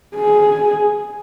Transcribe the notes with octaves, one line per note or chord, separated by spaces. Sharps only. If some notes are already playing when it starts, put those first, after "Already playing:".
G#4